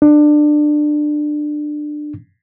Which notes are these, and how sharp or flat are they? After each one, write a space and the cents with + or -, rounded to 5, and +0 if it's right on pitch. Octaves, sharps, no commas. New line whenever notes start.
D4 +20